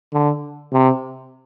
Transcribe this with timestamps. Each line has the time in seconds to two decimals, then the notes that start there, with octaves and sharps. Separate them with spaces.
0.13 D3
0.72 C3